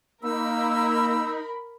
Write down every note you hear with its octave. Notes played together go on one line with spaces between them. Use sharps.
A#3 D#4 A#4 B5 E6